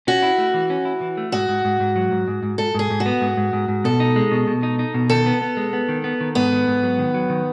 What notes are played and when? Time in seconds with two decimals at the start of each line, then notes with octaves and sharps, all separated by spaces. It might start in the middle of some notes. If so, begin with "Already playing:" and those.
0.07 C#4 F#4
0.23 E4
0.38 A3
0.54 E3
0.70 C#4
0.85 E4
1.01 E3
1.17 A3
1.32 G#2 F#4
1.49 G#2
1.65 G#2
1.80 G#2
1.96 F#3
2.11 G#2
2.28 G#2
2.43 G#2
2.58 G#2 A4
2.75 G#2 G#4
2.91 G#2
3.00 F#4
3.06 B3
3.21 G#2
3.37 G#2
3.53 G#2
3.68 G#2
3.84 B2 A4
4.00 D#4
4.16 G#3
4.31 B2
4.47 B2
4.63 D#4
4.79 D#4
4.94 B2
5.10 D#3 A4
5.26 B3
5.42 B3
5.57 G#3
5.73 B3
5.89 D#3
6.04 B3
6.21 D#3
6.35 G#2 B3
6.52 D#3
6.67 G#2
6.83 F#3
6.99 D#3
7.14 F#3
7.30 D#3